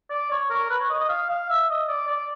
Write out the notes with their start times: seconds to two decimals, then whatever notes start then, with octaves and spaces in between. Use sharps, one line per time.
0.10 D5
0.31 C#5
0.50 A#4
0.70 B4
0.80 C#5
0.90 D#5
1.00 D#5
1.09 F5
1.30 F5
1.50 E5
1.69 D#5
1.89 D5
2.08 D5